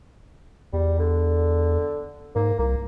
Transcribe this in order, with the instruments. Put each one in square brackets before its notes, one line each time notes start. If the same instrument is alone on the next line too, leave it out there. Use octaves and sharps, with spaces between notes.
[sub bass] E2 [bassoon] G3
[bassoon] D3
[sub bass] G#2 [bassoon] A#3
[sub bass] C2 [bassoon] A#3